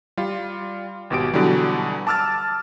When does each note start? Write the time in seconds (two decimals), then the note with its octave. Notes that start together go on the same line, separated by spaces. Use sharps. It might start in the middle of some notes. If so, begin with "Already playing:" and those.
0.17 G3 F4
1.10 G#1 B2 G4 D7
1.34 B2 D3 E3 F#3 G3
2.07 A5 D6 E6 F6 A6